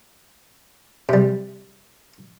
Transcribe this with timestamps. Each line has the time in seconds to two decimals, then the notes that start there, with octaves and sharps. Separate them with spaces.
1.09 C3 G3